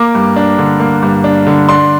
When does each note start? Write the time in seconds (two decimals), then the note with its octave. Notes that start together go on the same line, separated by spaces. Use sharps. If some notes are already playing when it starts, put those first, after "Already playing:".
Already playing: A#3 D6
0.15 G2
0.36 D4
0.58 D3
0.80 A#3
1.03 G2
1.24 D4
1.47 D3
1.68 D4 C6